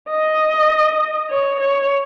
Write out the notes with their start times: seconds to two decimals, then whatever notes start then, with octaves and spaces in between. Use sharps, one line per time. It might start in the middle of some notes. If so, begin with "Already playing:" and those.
0.09 D#5
1.30 C#5
1.60 C#5